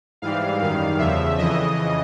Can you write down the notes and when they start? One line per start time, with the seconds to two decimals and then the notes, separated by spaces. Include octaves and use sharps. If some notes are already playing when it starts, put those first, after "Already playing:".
0.22 G#2 E3 G3 F5
0.61 F#2 D#3 G3 F5
0.99 E2 C#3 F3 E5
1.38 F2 C#3 E3 D#5